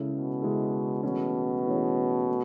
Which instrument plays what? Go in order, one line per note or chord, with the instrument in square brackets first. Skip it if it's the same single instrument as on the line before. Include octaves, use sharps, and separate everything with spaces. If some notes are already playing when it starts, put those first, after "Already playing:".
Already playing: [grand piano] C#3 G#3 C#4 E4 A4
[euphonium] B2
[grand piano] C#3 G#3 C#4 E4 A4
[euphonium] B2 [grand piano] E3 A3 C#4 G#4 C#5
[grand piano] E3 A3 C#4 G#4 C#5
A3